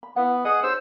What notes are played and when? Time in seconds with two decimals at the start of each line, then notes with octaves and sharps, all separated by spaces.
0.03 B5
0.16 B3 E4 F#5
0.45 G#4 D#5 F#5 D#6
0.63 D#4 G4 C5 C#5 E6